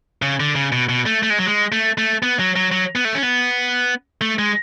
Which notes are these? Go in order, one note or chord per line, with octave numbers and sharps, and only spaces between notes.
C#3
D3
C#3
B2
B2
A3
A3
G#3
F#3
G#3
A3
A3
B3
F#3
F#3
F#3
B3
A3
C#4
B3
A3
G#3